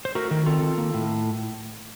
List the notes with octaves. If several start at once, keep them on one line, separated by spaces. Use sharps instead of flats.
C5
A3 F#4 A#4
D#3 F#4 A#4
C4 F4 A4
D#3
A#3
A2